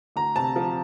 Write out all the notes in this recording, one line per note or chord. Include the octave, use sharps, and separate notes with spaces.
D2 A#5
C3 A5
F3